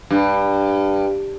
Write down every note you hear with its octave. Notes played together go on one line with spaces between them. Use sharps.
G2